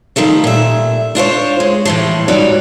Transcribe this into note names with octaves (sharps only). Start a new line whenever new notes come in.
D#3 F3 G3 A3
A#2 E5
D4 F4 C5 C#5
G#3
A2 E3 F3
G#2 G3 F#4 C#5 D5